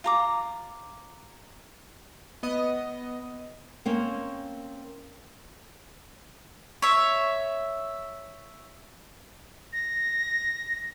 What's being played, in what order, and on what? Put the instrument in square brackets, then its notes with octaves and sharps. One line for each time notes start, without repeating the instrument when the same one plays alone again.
[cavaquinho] F4 A#5 D6
[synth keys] B3 D#5
[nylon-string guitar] A#3 C4 C#4
[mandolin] C#5 E5
[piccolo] A#6